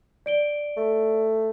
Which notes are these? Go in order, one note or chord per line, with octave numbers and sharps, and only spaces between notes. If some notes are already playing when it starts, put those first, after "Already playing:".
D5 D7 G7
A3